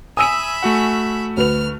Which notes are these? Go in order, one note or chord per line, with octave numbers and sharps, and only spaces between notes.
E5 G#5 B5 D#6 E6 D#7
A3 F#4 F#5
D2 B4 F6 F7